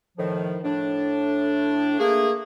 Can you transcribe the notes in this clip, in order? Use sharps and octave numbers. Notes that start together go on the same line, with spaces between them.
A2 D#3 F3
A2 D4
A3 A#3 G#4